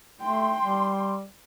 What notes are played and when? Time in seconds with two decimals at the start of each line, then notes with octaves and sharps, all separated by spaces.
0.21 A3 G5 C6
0.62 G3